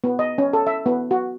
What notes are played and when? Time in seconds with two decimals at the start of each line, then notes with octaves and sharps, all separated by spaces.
0.04 B3
0.19 D#5
0.38 C#4
0.53 A4
0.67 E5
0.86 B3
1.11 F#4